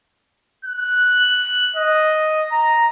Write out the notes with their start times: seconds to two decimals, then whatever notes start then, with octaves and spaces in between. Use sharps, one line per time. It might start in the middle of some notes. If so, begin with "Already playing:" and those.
0.65 F#6
1.76 D#5
2.52 A#5